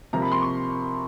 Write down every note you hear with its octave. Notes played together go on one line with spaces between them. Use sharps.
C3 F3 A#3 A#5
B5
C6
C#6